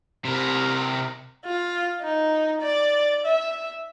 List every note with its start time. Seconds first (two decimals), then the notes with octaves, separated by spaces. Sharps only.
0.25 C3 A#4
1.45 F4
2.02 D#4
2.62 D5
3.26 E5